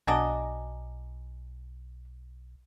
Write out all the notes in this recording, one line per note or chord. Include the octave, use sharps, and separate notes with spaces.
B1 D4 F#4 D#5 G#5 A#5 D6